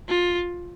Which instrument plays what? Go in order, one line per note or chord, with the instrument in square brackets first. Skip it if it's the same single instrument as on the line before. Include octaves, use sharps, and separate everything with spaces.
[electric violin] F4